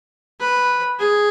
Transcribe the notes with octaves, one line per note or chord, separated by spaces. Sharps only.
B4
G#4